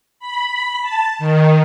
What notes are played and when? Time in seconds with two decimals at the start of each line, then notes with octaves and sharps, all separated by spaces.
0.19 B5
0.81 A5
1.19 D#3